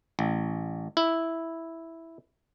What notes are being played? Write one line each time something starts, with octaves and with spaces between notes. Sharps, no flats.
A1
E4